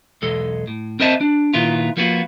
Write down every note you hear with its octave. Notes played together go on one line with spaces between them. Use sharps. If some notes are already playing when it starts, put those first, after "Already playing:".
B1 E2 G#3 A4
A2
C4 A#4 C5 D#5 E5 A5
D4
A#2 D#3 B3 E4 F4
F3 A#3 B3 F4 F#4